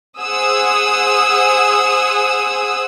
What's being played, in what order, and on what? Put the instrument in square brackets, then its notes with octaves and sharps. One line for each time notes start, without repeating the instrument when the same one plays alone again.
[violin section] G#4 C5 F#5 G#5 D#6 E6